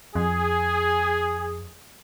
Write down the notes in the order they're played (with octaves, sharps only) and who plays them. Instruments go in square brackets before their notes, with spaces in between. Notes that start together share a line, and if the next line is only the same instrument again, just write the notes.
[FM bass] F2 [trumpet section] G#4